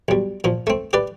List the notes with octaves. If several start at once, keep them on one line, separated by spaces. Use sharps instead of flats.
B1 G3
A#2 F3
A3 C4
G4 B4 D5